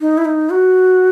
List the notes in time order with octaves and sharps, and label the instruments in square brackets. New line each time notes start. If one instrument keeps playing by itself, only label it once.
[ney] D#4
E4
D#4
F#4